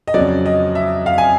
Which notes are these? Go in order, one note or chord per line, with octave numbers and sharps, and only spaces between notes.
D#5
F2 C#3 F#3 D5
D#5
E5
F5
G#5